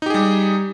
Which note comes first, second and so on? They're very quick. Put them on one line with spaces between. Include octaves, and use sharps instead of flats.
D#4 G4 G#4 G3